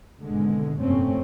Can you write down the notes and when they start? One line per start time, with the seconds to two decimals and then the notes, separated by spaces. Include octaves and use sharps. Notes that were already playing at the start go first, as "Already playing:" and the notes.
0.22 G#1 B2 D3 G#3
0.79 F1 G2 A#2 A3 C4 C#4